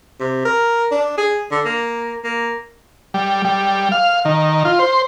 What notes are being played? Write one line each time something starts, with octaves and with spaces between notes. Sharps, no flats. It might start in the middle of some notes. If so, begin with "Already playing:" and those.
C3
A#4
D4
G#4
D3
A#3
A#3
G3
G3
F5
D#3
F4
C5